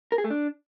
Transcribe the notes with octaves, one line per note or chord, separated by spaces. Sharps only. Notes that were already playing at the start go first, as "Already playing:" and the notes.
A#4
G#4
A3
D4